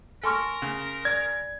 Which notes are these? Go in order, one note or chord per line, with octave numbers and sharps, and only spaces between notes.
A4 A#4 G#5 C6 C#6 F6
C#3
D5 G#6